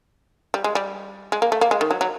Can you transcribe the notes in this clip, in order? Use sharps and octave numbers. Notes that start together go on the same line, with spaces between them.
G3
G#3
G3
G#3
A#3
A3
A#3
G#3
D#3
F#3
F#3